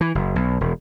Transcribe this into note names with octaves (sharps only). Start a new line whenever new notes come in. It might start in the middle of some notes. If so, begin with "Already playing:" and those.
E3
F#1
B1
E1